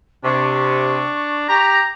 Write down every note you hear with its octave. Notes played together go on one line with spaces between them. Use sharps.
C3 D4 C#6
G4 A#5